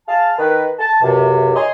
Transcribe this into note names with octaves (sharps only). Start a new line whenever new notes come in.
G#4 F5 A5
D#3 B4
A5
C#2 F#2 C3
C#5 D#5 G#5 C6